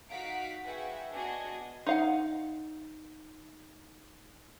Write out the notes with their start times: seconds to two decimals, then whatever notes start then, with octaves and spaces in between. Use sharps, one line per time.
0.10 D#4 F#4 F5 F#5 B6 D7
0.64 F#4 G#4 B4 E5 F#5 G5
1.11 B3 D4 F#4 G#4 D#5 G#6
1.87 D#4 F5 F#5